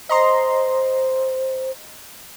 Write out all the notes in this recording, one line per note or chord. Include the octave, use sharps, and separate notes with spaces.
C5 D#5 A#5 C6